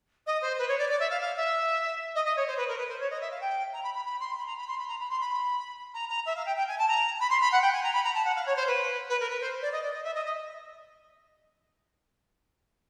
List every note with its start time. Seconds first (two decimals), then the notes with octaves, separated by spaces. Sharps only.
0.26 D#5
0.42 C5
0.58 B4
0.68 C#5
0.78 D5
0.89 D5
1.00 E5
1.10 F5
1.21 F5
1.36 E5
2.15 D#5
2.25 D#5
2.37 C#5
2.47 C5
2.57 B4
2.68 A#4
2.78 B4
2.89 C5
3.00 C#5
3.11 D#5
3.21 E5
3.31 F5
3.41 G5
3.73 A#5
3.83 B5
3.94 B5
4.05 B5
4.20 C6
4.36 B5
4.46 A#5
4.58 B5
4.67 C6
4.78 B5
4.88 A#5
5.00 B5
5.09 C6
5.20 B5
5.94 A#5
6.09 A#5
6.26 E5
6.35 F5
6.46 G5
6.56 G5
6.68 G#5
6.78 A5
6.88 A#5
7.20 B5
7.30 C6
7.41 B5
7.52 F#5
7.62 G5
7.73 G#5
7.83 A#5
7.93 B5
8.04 A#5
8.14 A5
8.25 F#5
8.36 F5
8.46 C#5
8.56 C5
8.67 B4
9.09 B4
9.20 A#4
9.30 B4
9.41 C5
9.62 D5
9.72 D#5
9.83 D5
9.94 D#5
10.04 E5
10.14 D#5
10.25 D#5